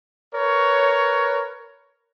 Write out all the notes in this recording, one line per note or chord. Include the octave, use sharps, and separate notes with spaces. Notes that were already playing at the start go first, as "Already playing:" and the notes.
A#4 B4 C#5